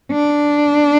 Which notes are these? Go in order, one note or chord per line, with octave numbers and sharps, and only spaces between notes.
D4